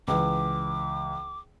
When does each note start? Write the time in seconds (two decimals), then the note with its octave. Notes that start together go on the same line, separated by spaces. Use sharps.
0.08 C#2 E3 D6